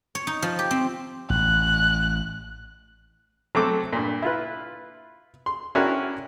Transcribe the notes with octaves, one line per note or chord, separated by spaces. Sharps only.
C#5
D#4
F3
G4
C4
A1 F#6
F#3 A3 C4 A4 C5 D6
G2 A#2
E4 F4 B4
C6
C#4 D4 E4 F#4 G4 A#4